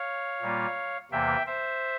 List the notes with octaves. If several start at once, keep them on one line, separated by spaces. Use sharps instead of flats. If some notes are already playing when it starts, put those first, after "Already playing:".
Already playing: C#5 F5
A#2 G3 A#3 F4
E2 C3 E3 A#3 E5 G5
C5 E5